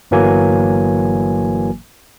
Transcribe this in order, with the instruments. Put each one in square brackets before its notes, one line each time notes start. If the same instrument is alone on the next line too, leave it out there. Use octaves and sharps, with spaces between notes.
[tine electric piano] G1 E3 F#3 A#3 G#5